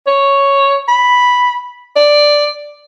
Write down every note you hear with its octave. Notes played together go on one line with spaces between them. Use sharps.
C#5
B5
D5